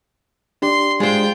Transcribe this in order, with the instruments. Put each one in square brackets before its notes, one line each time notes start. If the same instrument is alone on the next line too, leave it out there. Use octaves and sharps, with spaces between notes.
[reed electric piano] D4 G4 D5 [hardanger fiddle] C6
[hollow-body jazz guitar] G#3 C5 [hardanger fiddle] F4 G5